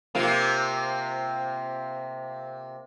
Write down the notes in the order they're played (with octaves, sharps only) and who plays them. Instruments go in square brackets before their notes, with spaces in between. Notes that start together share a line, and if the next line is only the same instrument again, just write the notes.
[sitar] C3 A#3 F4